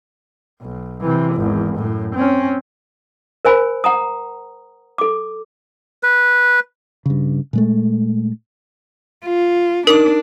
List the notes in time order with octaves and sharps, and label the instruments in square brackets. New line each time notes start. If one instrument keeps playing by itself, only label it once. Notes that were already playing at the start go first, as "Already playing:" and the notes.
[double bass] B1
C3 E3
G#1 E2
F#2 A2
C4 C#4
[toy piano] A#4 C5 G#5 B5
F#5 A#5 D#6
A4 D6
[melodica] B4
[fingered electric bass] G2 C#3
A#2 G#3 A3
[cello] F4
[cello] D4 [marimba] D#4 [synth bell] A#4 D6